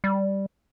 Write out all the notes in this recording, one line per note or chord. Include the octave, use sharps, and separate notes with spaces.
G3